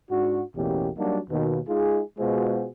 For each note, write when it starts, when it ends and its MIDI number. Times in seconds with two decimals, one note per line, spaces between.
0.10 0.41 44
0.10 0.41 62
0.10 0.41 66
0.56 0.89 33
0.56 0.89 40
0.56 0.89 47
0.56 0.89 58
0.56 0.89 61
0.56 0.89 67
0.97 1.18 54
0.97 1.18 55
0.97 1.18 58
0.97 1.18 62
0.97 1.18 63
0.97 1.18 66
1.30 1.60 39
1.30 1.60 47
1.68 2.01 56
1.68 2.01 63
1.68 2.01 65
1.68 2.01 68
2.18 2.67 47
2.18 2.67 56
2.18 2.67 65
2.18 2.67 66
2.18 2.67 68
2.18 2.67 72